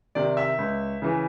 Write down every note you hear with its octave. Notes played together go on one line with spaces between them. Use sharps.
C3 D#3 D5
E5
C#2
C#3 E3